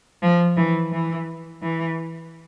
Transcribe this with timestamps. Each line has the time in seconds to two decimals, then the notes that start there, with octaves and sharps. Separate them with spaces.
0.23 F3
0.57 E3
0.92 E3
1.62 E3